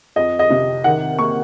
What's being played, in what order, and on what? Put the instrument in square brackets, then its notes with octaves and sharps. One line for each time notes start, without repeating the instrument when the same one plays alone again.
[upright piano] F2 D#5
D#5
C3
D#3 F#5
A#3 C#6